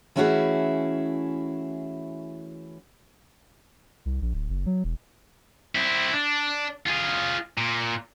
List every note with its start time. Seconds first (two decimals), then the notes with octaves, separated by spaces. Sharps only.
0.16 E3 A3 C#4 E4 F#4 G#4
4.05 C2
4.22 A#1
4.34 D1
4.49 F#1
4.66 F#3
4.84 E1
5.75 C4 E4
6.13 D4
6.87 F4 G#4
7.58 A#2